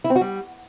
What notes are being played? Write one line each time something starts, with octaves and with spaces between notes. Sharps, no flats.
E4
C4
F#4
G3